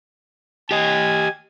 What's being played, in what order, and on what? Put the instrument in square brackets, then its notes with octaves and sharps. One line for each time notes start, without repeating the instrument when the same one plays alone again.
[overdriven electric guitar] G4 D#5 [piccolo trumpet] G#5